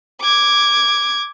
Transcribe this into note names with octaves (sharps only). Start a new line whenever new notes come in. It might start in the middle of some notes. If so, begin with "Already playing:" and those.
D6 G#6